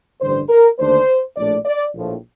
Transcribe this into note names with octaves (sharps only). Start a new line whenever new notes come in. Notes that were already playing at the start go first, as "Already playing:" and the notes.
A1 G2 D3 G3 C5
A#4
D#2 D3 A3 D4 C5
A#1 A2 A3 D4 D5
D5
A#1 A2 F3